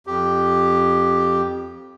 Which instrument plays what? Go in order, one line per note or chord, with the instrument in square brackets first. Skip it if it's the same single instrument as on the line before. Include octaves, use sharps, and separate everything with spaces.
[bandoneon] F2 G4